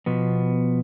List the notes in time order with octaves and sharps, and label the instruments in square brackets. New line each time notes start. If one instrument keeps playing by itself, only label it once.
[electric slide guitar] B2 F3 B3